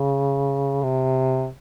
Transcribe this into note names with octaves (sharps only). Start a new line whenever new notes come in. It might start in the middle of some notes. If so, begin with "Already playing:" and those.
Already playing: C#3
C3